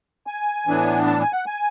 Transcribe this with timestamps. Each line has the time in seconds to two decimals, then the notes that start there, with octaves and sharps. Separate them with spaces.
0.27 G#5
0.67 A2 E3 B3 D4
1.06 A5
1.20 G#5
1.33 F#5
1.47 G#5